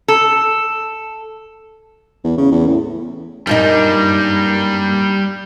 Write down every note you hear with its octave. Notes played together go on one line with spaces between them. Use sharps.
A4
E2
C#3
E2
A2
F#2 A#2 G3 D4 D#4